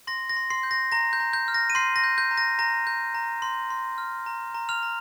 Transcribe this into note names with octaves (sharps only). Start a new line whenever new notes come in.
C6 A#6
A#6
C6
C6 C7
G6
A#6
A#5 A#6
G6
A#5
G6
F6
A#6
D#7
C6 G6 C7
A#6
G6
G6
A#5
A#6
A#5 A#6
G6
A#5
C6
C6
F6
A#5
A#5
F6 F7
A#5